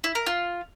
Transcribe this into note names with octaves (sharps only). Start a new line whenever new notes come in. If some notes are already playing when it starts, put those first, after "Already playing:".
E4
A#4
F4